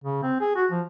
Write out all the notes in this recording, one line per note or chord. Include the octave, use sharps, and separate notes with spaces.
C#3
C4
G#4
F#4
F3